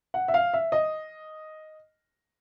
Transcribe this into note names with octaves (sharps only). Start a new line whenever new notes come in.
F#5
E5
F5
E5
D#5